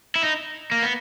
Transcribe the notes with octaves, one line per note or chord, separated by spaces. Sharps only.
E4
D#4
A#3
B3